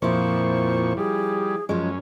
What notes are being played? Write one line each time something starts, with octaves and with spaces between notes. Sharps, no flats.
F2 A#2 F3 E4 C5 C#6
G3 G#4
F#2 F3 G#3 C#4